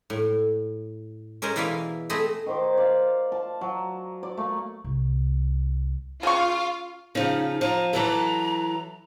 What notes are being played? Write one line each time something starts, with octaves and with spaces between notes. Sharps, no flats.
A2
C#4 G#4 A#4 C5 D#5
B2 E3 E4 D5 F5 G#5
A3 C4 G#4 D#5 B5
D#3 C5 D6
D5 F5
A5
F#3
D5
A3 A#3
C2
C#3 F4 F5 C#6
C#3 F3 D#4
F3 A#5
E3 F#3 A4 A#5